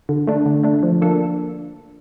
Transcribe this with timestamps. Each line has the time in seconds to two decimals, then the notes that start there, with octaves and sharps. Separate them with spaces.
0.09 D3
0.27 A3 D4
0.46 D3
0.64 A3 D4
0.83 F3
1.02 A#3 D4 A4